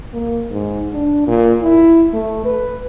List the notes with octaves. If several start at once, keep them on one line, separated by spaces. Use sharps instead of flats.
A#3
G#2
D4
A#2
E4
A3
B4